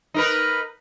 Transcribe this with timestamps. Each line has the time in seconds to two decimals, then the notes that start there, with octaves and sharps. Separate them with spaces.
0.14 D#4 A#4 B4